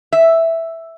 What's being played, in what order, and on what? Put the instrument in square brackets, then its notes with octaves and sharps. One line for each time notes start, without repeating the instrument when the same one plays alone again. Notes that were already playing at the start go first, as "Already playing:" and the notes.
[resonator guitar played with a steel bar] E5